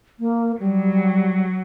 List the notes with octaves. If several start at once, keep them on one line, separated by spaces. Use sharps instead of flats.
A#3
F#3 G3